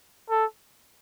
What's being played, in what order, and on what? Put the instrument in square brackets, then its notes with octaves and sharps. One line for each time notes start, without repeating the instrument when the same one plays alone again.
[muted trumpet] A4